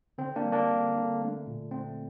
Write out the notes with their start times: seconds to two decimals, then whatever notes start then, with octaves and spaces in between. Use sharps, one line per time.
0.18 D3 C4
0.36 A#3 D4
0.45 G3
0.52 A#3 D4
0.70 D3
0.95 D3
1.21 A3
1.47 A#2
1.71 A3 C4